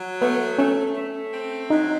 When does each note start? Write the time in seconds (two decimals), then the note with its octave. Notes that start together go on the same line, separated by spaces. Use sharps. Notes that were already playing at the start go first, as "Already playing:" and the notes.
Already playing: F#3
0.21 A3 B3
0.58 A3 C#4
0.96 A3
1.34 C4
1.70 F#3 D#4